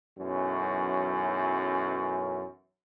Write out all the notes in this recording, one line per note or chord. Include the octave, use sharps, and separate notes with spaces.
B1 F#2 E3 C#4